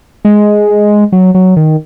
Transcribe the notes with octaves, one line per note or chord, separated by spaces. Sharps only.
G#3
F#3
F#3
D#3